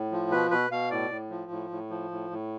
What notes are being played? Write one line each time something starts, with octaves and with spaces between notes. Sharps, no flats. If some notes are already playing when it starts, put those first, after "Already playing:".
Already playing: A2
F3
B2 B4
B2 B4
B2 F5
A2 D5
A2
F3
A2
A2
F3
A2
A2